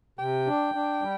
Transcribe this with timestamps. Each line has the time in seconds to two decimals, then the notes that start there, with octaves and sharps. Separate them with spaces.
0.19 C3 G5
0.47 D4
0.74 D4
1.02 G3